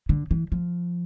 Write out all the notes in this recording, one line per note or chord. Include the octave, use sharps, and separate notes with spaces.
D3
E3
F3